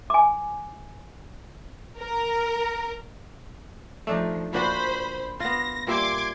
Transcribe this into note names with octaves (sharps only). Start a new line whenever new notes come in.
G#5 D6
A#4
F3 A3 D4 D#4
A#2 D4 F#4 C5 B5
B3 F4 A#6
A#2 G3 E5 C6 D6 G#6